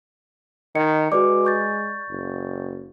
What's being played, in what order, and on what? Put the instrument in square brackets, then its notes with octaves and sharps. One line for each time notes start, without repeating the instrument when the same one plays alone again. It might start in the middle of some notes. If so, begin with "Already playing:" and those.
[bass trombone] D#3 [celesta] D#5 [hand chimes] C#7
[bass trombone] G#3 [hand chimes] F#4 B4 D6 [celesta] D5
[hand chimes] C#6 G6 A6
[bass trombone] F#1